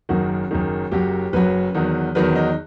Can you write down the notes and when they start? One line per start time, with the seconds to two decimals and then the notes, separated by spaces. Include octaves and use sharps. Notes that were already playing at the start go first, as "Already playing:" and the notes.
0.09 F#1 F#2 D#3 F#4
0.51 F#1 F#2 D#3
0.91 F#1 F#2 F#3 G4
1.33 F#1 F#2 F#3 B4
1.74 E2 D#3 F#3
2.15 E2 D#3 F#3 B4
2.36 D#4